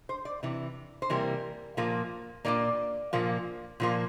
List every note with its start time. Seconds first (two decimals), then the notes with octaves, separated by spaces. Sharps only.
0.09 C5
0.25 D5
0.43 C3 E3
1.02 C5
1.10 C3 E3 G3 A#3 A#4
1.77 A#2 F3 A#3
2.45 A#2 F3 A#3 D5
3.13 A#2 F3 A#3
3.80 A#2 F3 A#3